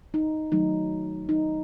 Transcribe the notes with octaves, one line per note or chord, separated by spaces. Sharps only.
D#4
D#3 F#3 A3 D#4
D#4